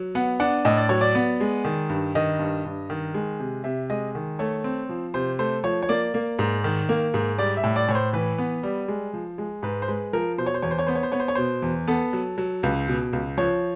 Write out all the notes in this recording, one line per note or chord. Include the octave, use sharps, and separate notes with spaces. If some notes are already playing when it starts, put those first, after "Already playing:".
Already playing: F#3
B3 F#5
D4 F#5
A2 D#5
D5
F#3 C#5
D5
B3
G#3
D#3
G2
D#3 D#5
G2
G2
D#3
G#3
C3
C3 E5
G#3 D#5
D#3
A3 C#5
C4
F3
C3 C5
A3 C5
F3 C#5
C#5
A#3 D5
A#3
G#2
D#3
A#3
G#2
G3 D5
E5
A2
D5
A2 C#5
C5
E3 B4
B3
G3
G#3
F3
G#3
G#2 B4
C5
G#3 B4
F3 A#4
B2 C5
C#5
C5
E2 C#5
C5
C#5
B3 C5
C#5
C5
B3 C#5
C5
C#5
B2 C5
E2
B3 A4
F#3
F#3
C#2
B2
C#2
F3 C#5